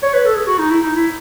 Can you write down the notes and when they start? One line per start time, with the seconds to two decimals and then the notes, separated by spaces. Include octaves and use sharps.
0.03 C#5
0.14 B4
0.25 A4
0.35 G#4
0.47 F#4
0.59 D#4
0.70 E4
0.83 D#4
0.95 E4